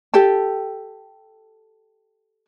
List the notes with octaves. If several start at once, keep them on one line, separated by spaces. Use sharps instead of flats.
G4 A4 G5 A5